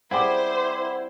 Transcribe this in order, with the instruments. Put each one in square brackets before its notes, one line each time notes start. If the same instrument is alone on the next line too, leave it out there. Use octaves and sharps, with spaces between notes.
[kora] G3 C4 G#4 [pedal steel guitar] E4 [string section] C5 [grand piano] F#5 G5 D6